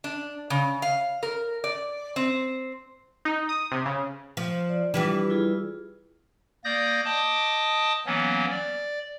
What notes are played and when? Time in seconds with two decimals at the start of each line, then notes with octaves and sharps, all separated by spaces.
0.04 D4
0.50 C#3
0.82 F5
1.23 A#4
1.64 D5
2.16 C4
3.25 D#4
3.49 D#6
3.72 C3
3.85 C#3
4.37 F3
4.69 D5
4.94 E3 G3 D4 F4 G4
5.30 E4 F4 G#4
6.64 A#3 D5 D#6 G6 A#6
7.05 D#5 G5 A5 D6 D#6
8.06 E3 F#3 A#3 B3 C#4
8.50 D5